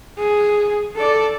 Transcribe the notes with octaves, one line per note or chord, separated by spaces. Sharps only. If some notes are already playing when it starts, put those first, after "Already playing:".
G#4
A4 D5